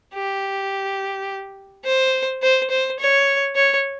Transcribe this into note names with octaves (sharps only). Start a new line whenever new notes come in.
G4
C5
C5
C5
C#5
C#5